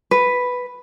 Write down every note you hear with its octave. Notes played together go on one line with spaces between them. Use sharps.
B4